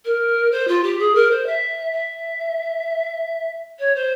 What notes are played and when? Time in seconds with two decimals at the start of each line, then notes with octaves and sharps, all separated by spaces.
0.05 A#4
0.51 C5
0.67 F4
0.83 G4
0.99 G#4
1.14 A#4
1.30 C5
1.46 E5
1.91 E5
3.79 C#5
3.95 C5